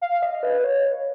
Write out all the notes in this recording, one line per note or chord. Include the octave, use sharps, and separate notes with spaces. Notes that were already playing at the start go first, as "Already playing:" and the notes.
F5
D#5
B4
C#5